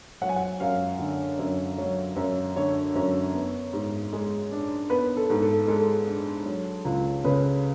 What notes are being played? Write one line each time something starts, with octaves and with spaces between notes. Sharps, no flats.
F#3 F#5
G#5
F#5
F#2 F5
D3
F#2
F#3
F#2
D3 C#5
F#2
B3
G#2
G#3
D4
B3 B4
A4
G#2
A4
G#3 A4
D4
F#3
C#2
C#3 B4